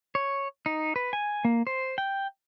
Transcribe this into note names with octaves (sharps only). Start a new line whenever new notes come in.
C#5
D#4
B4
G#5
A#3
C5
G5